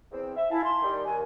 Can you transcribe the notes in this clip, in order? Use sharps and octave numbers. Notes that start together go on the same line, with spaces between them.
E2 C4
E5
E4 F5 G#5 A5
C6
D#3 G3
D#2 G#5